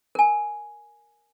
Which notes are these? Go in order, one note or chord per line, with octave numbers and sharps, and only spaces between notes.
A#4 G#5